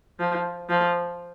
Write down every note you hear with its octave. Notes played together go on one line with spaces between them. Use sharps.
F3
F3